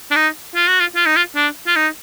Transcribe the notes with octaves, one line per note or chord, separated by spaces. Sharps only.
D4
D#4
F4
F#4
F4
F4
D#4
F4
D4
F4
D#4